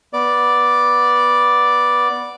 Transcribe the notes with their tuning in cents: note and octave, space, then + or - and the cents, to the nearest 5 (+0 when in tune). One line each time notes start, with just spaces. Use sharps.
B3 -10 D5 +0